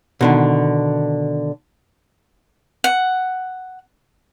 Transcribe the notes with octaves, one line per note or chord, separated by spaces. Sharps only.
B2 D3 D#3
F#5